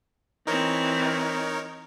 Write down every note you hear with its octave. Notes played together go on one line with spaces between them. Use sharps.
E3 C4 D#4 A#4 C#5